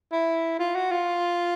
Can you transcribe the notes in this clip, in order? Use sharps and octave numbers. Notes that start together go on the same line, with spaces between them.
E4
F4
F#4
F4